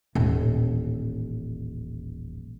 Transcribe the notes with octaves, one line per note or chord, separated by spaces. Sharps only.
D#1 A1